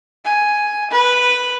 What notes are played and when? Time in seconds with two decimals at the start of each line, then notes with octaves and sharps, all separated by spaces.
0.25 G#5
0.91 B4